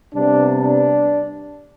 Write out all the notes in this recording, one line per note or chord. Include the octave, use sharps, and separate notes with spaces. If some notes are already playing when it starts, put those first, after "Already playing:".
C3 G3 B3 D4
D4